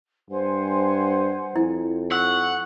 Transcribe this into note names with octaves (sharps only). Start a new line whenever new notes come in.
G2 C5 F#5 G#5
F2 E4
F#5 C#6 E6